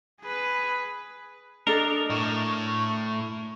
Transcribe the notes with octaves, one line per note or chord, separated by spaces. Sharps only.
G#4 B4
D4 A4 A#4 D#5
A2 C#6